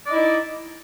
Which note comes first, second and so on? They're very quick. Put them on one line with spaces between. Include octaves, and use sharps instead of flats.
D5 D#5 E4 D#4